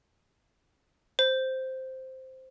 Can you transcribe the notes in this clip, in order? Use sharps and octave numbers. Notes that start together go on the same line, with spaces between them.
C5